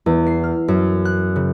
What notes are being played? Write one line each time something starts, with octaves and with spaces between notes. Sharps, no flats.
E2
C7
F6
F#2
F#6
C#3